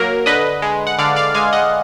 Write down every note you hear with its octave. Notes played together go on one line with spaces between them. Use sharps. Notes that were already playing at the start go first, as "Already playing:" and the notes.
Already playing: F#3 A#3 A#4
D3 B4 D#5
G#3
F#5
D3 D5 F5
D5 F5
G#3 F5 G#5
D#5 F#5